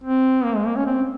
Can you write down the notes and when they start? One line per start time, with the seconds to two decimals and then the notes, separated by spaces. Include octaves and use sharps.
0.04 C4
0.44 A#3
0.55 G#3
0.66 A#3
0.76 C#4
0.86 C4